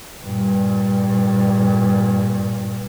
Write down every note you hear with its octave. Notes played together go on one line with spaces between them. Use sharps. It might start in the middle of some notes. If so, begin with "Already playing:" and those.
G2 A#2